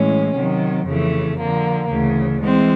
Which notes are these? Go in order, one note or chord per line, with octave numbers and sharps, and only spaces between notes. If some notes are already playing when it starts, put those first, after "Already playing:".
Already playing: A2 E3 G#3 C#4
C3 D#3 F#3
F2 C#3 E3 A3
D3 F3 A#3
D2 C#3 E3
E3 G#3 C4